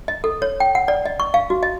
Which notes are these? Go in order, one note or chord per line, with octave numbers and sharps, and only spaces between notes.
D#5
A4
C#5
G5
F#5
D5
D#5
C#6
F5
F#4
D#5